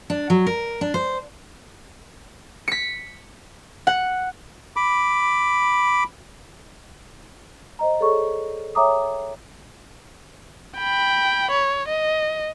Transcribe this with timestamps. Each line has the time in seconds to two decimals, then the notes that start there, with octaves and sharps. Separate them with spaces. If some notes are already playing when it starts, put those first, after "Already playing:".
0.10 D4
0.30 F#3
0.47 A#4
0.81 D4
0.94 C5
2.68 B6 C#7
3.87 F#5
4.76 B5 D6
7.79 C5 D#5 A#5
8.00 G#4 A4 C#5 D5 C#6
8.75 C#5 E5 G5 A#5 D6 D#6
10.77 G5 B5
11.51 C#5
11.88 D#5